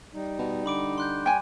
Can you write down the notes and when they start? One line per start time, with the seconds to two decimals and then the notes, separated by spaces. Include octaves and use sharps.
0.14 G3 D#4
0.38 B2
0.66 D3 B5 D6 D7
0.98 C6 F#6 G6
1.26 G3 G5 G#5